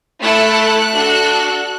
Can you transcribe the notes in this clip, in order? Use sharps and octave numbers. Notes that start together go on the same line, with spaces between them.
A3 E4 A4 F#6
D4 F#4 A4